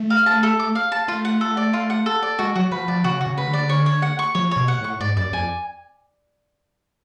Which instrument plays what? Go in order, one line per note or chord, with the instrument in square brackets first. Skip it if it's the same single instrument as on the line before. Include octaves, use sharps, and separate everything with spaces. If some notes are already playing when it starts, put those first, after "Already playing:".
Already playing: [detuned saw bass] A3
[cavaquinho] F5
A5
A4
D6
F5
A5
[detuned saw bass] A3 [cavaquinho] F4
[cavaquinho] F#5
A4
D5
F4
F#5
A4
D5
[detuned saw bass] G#3 [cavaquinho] F#4
[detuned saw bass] F#3 [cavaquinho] F#4
[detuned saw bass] F3 [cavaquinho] B4
[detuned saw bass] F3 [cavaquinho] D5
[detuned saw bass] C#3 [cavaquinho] F#4
[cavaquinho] F#4
[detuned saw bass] C#3
[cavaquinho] B4
[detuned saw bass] D3
[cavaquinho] D5
C#5
C#5
F#5
C#6
[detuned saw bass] F3 [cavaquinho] C#5
[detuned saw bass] B2 [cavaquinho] C#5
[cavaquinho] F#5
[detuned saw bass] A2
[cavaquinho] C#6
[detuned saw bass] G#2 [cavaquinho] D5
[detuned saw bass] F#2 [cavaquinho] D5
[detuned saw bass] F2 [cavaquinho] G#5